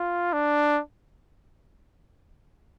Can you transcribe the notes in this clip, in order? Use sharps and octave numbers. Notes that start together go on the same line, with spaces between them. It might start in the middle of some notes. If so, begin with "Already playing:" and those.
Already playing: F4
D4